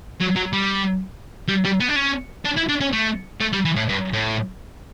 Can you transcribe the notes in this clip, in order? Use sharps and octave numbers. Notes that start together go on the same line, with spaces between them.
F#3
F#3
G3
G3
G3
B3
D4
C#4
D4
E4
D4
C#4
A3
A3
G3
E3
A2
G2
A2